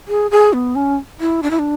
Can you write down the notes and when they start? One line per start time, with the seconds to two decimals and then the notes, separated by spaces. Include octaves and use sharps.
0.08 G#4
0.31 G#4
0.53 B3
0.75 C#4
1.20 E4
1.43 D4
1.51 E4
1.59 D4